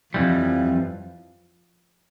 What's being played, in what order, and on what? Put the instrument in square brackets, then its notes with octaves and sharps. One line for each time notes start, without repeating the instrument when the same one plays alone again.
[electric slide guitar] F2 E3 G3 [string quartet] F3